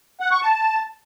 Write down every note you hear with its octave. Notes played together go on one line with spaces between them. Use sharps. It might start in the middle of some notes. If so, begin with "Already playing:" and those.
F#5
C#6
A5